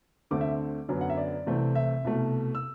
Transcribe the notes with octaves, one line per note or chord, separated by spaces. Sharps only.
D2 D3 A3 C4 D6
E5
F#2 D3 F#3 B3
F#5
E5
D5
C2 C3 E3 A3 C4
E5
C2 B2 A3
E6